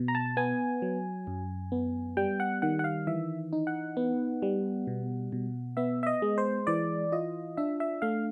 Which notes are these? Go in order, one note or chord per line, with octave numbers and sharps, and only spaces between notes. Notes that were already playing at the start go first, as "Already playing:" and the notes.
Already playing: B2
A#5
A5
B3 G#5
F#3
F#2
B3
G3 G5
F#5
D#3 F#5
F#5
F5
E3 E5
D#4
F#5
B3
G3
B2
B2
B3 E5
E5
D#5
G#3
C5
E3 D5
F4 D#5
D4 E5
E5
A3 F5